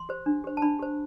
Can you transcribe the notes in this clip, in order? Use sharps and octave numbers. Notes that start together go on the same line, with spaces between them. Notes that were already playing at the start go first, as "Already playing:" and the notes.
Already playing: C6
G4 C5
D4
G4 C5
A5
D4 B5
G4 C5